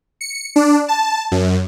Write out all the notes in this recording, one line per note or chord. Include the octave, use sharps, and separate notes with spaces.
C#7
D4
A5
F#2